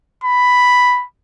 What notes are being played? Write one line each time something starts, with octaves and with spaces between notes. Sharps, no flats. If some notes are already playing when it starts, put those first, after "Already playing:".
B5